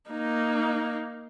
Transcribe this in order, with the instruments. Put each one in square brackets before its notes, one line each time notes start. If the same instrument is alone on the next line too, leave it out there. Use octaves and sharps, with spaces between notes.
[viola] A#3 D#4